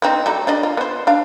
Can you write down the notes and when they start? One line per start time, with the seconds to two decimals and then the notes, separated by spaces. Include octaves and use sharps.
0.02 B3 C4 D#4
0.26 F#3 G3 A3
0.47 D4 D5 D#5
0.63 F4
0.77 B3 C5
1.07 D4 F5